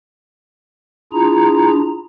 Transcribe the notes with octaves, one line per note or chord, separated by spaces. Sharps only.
D4 E4 F4 G#4 A#5